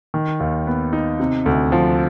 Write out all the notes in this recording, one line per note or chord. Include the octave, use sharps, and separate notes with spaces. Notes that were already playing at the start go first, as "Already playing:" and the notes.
D#3
D#2
B3
D#4
C3
D2
F3